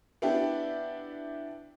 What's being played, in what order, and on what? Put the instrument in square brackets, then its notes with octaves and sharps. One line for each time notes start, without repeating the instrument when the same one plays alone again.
[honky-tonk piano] B3 D4 E4 G4